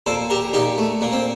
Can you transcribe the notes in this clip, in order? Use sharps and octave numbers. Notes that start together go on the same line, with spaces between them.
A#2 A4 C5
G4 A#4
A#2 D#4 G4
A3
A#2 A#3
C4